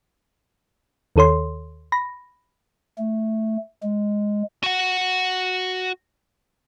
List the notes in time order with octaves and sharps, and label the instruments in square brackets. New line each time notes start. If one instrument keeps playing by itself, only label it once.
[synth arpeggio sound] D#2 D#3 A4 C#5 C6
B5 A#6
[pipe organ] A3
G#3
[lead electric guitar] F#4 F#5